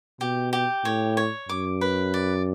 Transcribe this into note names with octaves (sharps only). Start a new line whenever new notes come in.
B2 G4
G4
A2 C#5
C#5
F#2 D6
B4
D5